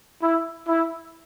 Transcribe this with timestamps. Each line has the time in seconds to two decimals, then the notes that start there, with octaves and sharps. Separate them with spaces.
0.22 E4
0.68 E4